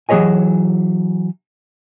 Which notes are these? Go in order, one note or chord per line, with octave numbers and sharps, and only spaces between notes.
E3 F#3 G#4 C#5 D#5 G#5